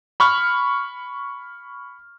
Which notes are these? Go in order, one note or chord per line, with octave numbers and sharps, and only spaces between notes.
B5 C#6 F6